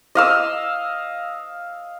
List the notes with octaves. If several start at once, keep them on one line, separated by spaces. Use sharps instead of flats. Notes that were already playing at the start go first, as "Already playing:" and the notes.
D#5 F5 E6